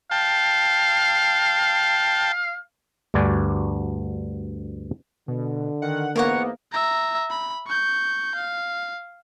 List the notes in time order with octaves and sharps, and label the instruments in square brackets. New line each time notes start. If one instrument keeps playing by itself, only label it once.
[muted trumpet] F5 [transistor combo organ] G5 A5
[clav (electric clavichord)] D2 G2 F#4 D5 G#5
[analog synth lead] B2 [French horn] D3
[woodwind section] D#3 [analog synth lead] F#5
[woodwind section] G#2 E3 B3 [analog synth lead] A#3 [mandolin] A#4 C#5 F#5
[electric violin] E5 A#5
B5
C#6 G6
F5